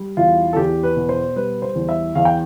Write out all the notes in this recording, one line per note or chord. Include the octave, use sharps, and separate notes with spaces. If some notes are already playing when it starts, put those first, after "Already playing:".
Already playing: G3
E2 F4
A4
E2 G4
B4
B2
C5
G3 B4
C5
E2
E5
E2 F5
G5